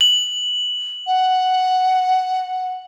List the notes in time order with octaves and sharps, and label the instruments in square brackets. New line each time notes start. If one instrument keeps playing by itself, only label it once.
[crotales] F#7
[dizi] F#5